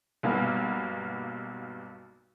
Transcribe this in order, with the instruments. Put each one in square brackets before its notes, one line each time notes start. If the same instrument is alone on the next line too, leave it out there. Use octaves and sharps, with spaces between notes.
[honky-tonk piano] B1 G2 A#3 B3